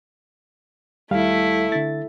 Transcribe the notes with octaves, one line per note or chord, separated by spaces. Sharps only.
D#2 G3 A3 E4 F5
D3 A6